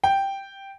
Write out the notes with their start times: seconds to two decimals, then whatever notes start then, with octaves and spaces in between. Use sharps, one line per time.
0.04 G5